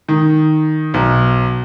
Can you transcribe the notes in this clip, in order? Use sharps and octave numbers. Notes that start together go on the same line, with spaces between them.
D#3
B1